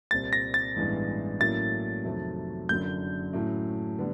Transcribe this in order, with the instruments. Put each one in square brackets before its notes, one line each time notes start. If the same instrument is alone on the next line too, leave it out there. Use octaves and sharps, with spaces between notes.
[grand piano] C2 A#2 G3 C4 [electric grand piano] A6
[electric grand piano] A#6
A6
[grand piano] A1 G2 E3 G#3 B3
[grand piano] A2 F#3 A#3 C#4 E4 [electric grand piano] A6
[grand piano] F2 C3 D#3 F#3 A3
[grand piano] F#1 F#2 D3 F#3 [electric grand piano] G6
[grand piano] A2 F#3 A3 C#4 E4
D3 G3 B3